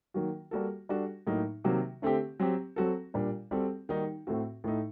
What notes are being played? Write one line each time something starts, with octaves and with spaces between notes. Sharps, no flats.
D#3 F#3 A#3 F#4
G3 A#3 F#4 A4
G3 D4 F#4 A4
A2 F#3 A#3 D#4
C3 D#3 F#3 A#3 F#4
D3 A3 C4 G4
F#3 C4 G4
F#3 C4 F#4 A4
A#2 G3 D4
G3 C4 F#4 A4
D#3 G3 A#3 D#4 F#4
A2 A3 C4 F#4
A2 A3 D#4